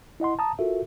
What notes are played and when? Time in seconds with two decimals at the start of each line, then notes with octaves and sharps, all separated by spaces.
0.20 E4 D#5 F#5 C6
0.39 A5 A#5 D#6
0.59 F4 F#4 A4 A#4 E5